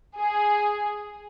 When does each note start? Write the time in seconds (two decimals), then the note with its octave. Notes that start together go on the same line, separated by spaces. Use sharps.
0.17 G#4